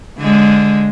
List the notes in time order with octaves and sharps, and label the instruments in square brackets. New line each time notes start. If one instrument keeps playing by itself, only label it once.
[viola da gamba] D3 G#3